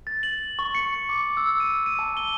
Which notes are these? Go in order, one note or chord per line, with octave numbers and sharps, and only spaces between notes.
A6
F#7
C#6
C#7
D6
E6
D#7
D#7
A5
G7